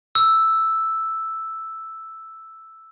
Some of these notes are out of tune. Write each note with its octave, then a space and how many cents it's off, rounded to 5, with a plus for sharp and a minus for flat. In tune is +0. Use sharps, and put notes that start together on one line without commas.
E6 +0